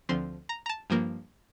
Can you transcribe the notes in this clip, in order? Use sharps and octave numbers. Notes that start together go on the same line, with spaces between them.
D2 D3 F3 C4 C6
A#5
A#5
A5
G2 F3 A#3